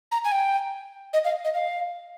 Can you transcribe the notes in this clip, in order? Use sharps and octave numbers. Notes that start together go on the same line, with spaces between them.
A#5
G#5
G5
D#5
F5
D#5
F5